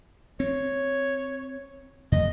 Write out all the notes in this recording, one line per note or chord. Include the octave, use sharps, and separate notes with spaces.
C4 C#5
F2 C3 A3 D#5